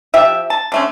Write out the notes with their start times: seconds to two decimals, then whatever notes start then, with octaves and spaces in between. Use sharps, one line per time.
0.14 F3 G4 E5
0.50 A5
0.72 D3 A3 C#4